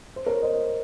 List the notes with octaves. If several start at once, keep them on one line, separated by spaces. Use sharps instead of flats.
C5
A#4 C#5
C5 D#5